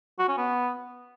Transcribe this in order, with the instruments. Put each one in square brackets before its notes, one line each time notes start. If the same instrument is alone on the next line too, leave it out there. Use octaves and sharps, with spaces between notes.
[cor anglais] F#4
C#4
B3